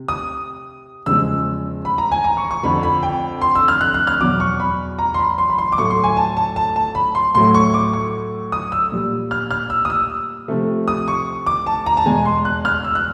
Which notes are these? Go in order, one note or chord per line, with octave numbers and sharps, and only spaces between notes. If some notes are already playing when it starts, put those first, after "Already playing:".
Already playing: C3
D#6
E2 C#3 F3 G#3 E6
B5
A#5
G#5
A#5
C#6
C#6
F2 D3 F3 B5
B5
G5
C6
E6
F6
F#6
F#6
F6
E2 B2 F#3 D6
C#6
B5
A#5
C6
B5
C6
B5
C6
D6
A2 F#3 A3 C#6
C6
G#5
A5
A5
A5
A5
B5
C6
A2 F#3 A3 C6
C#6
D6
C#6
D#6
E6
A#2 G3
F6
F6
E6
D#6
E6
C3 F3 A3
D#6
C#6
D6
A5
A#5
A5
E2 B2 G#3 G#5
C6
F#6
F6
E6
F#6